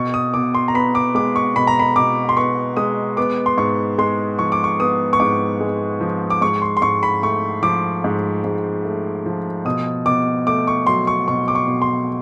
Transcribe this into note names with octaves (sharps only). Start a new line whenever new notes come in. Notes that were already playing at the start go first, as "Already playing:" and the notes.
Already playing: B2 C#6
D#6
B2 D6
C6
A#5
B3 B5
D6
G#3 D6
C#6
B2 B5
A#5
B5
B2 D6
C6
B3 C#6
G#3 D#6
B3 D6
C6
G#2 C#6
G#3 C6
F3 C#6
D6
C#6
B3 D#6
C#6
G#2 D6
G#3
F3
D6
G#2 C#6
C6
C6
G#2 C#6
B5
A3 C#6
F3 D6
G#2
G#2
A3
F3
B2 D#6
B2 D6
A3 D6
C#6
F#3 C6
C#6
B2 C#6
D6
C#6
B2
C6